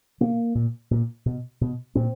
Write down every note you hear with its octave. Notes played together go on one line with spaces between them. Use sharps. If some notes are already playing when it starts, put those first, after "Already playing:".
B2 A#3
A#2
A#2
B2
B2
A#2 C4